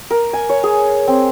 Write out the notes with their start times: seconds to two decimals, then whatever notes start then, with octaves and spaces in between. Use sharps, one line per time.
0.11 A#4
0.33 G#5
0.49 C#5
0.64 G#4
1.08 C4